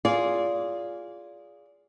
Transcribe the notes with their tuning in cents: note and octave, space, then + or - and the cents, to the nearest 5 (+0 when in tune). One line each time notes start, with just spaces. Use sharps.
F4 +0 G#4 -5 D5 -30